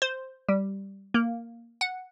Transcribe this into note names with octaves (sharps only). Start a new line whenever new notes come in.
C5
G3
A#3
F#5